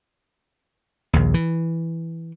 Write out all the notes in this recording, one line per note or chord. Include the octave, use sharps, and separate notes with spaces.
A#1 D#2
E3